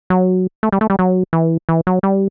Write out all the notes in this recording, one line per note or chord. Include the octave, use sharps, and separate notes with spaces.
F#3
A3
G3
A3
G3
F#3
E3
E3
F#3
G3